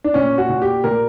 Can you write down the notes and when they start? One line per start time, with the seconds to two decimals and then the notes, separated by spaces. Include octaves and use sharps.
0.04 D4
0.14 A#2 C#4
0.38 F#4
0.49 A#2
0.62 G4
0.84 A#2 A#4